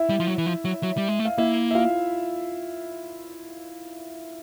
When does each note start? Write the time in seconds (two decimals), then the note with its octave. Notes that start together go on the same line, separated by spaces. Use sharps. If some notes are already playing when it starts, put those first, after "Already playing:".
Already playing: E4 E5
0.09 G3
0.20 F3
0.27 F#3
0.38 E3
0.46 F3
0.65 F#3
0.83 F#3
0.97 G3
1.08 G#3
1.19 A3
1.25 F5
1.38 A#3 E4 E5
1.71 E5
1.74 F4 F5